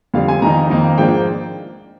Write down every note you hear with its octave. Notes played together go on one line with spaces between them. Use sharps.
F2 D3 G3 F5
G#5
F2 D#3 A#3 D#4 A#5
F2 D#3 A#3 D#4
G#2 F3 A#3 D4 G5